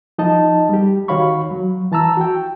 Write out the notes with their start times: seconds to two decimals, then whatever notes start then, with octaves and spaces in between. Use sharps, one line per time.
0.18 F3 D#4 D#5 A5
0.69 G3 G4
1.08 D#3 F#4 C#5 F5 B5 C#6
1.51 F#3
1.92 E3 A5 A#5 E6
2.17 F#4 G5